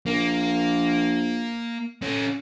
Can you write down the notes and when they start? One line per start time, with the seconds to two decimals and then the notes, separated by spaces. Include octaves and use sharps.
0.06 A#1 A#3
2.02 C#4 A4